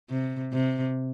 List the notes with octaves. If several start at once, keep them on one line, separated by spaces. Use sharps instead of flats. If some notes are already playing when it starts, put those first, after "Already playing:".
C3
C3